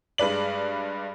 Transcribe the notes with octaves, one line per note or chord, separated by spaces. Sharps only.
G2 G#3 B4 D5 F#7